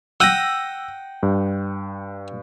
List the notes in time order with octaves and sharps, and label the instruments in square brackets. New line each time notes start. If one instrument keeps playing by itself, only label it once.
[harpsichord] F#5 G5 D#6 [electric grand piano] E6 A#6
[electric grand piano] G2